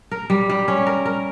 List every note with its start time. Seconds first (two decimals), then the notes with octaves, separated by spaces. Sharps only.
0.11 A#4
0.30 G3
0.50 G3
0.68 C#4
0.87 A#4
1.06 A#4